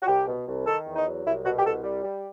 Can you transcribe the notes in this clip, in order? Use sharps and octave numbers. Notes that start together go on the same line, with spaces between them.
F#4
C2 G4
B2
C2
D#3 A4
E2
D#4
F#3
C2 E4
B2 F#4
G4
C2 A4
G3
G3